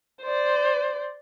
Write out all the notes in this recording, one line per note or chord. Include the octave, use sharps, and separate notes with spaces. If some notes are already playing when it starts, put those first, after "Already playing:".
C5 D5